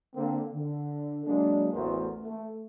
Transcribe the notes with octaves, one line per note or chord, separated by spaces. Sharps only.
D3 A#3 C4
D3
F#3 G#3 A#3 D4
A1 E2 A3 F#4 A#4 C5
A3